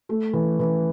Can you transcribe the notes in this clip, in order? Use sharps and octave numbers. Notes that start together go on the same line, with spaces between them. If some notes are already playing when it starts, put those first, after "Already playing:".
A3
E3
E3